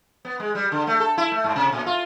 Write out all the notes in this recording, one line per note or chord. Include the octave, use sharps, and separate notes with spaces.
B3
G#3
G3
D3
A3
A4
E4
A3
G#2
C3
A#2
F4